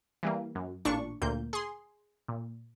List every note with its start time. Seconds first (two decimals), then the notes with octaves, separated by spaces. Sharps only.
0.23 E3 G3 A#3
0.55 F#2
0.85 A1 A#2 D4 C#6
1.22 D2 A#2 A#3 G6
1.53 G#4 C6
2.28 A#2